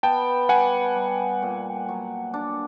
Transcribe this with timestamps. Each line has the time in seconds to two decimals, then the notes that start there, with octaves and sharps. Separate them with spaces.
0.03 B3 G5 A5
0.49 G3 F#5 G#5
0.96 G3
1.42 A#2
1.89 F#3
2.34 D4